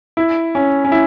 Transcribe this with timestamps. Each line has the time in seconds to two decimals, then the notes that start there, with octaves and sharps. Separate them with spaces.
0.17 E4
0.55 C#4
0.85 C#4
0.92 E4